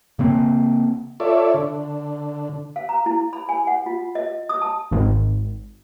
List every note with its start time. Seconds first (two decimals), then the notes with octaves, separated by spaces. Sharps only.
0.19 C#3 A#3 C4
1.20 F4 A4 C#5 D5 E5
1.54 D3
2.76 F5
2.89 A#5
3.06 E4
3.33 B5
3.49 G#5
3.67 F#5
3.86 F4
4.15 D#5
4.49 D#6
4.62 A5
4.91 G#1